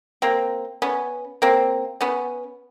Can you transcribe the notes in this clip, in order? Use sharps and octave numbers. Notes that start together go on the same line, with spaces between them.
A#3 C4
B3 C#4
A#3 C4
B3 C#4